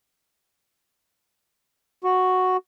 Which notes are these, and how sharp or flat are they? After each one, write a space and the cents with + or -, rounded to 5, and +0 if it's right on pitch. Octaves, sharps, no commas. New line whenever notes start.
F#4 +0 C#6 +0